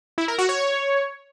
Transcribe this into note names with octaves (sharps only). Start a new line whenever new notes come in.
E4
A#4
F#4
C#5